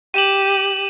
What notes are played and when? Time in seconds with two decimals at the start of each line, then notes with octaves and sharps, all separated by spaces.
0.14 G4 D#7 E7 F#7